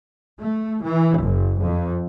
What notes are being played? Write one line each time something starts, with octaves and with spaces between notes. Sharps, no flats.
A3
E3
F#1
F2